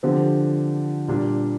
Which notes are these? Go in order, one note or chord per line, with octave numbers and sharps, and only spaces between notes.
D3 F3 C4 G4
A#2 G3 D4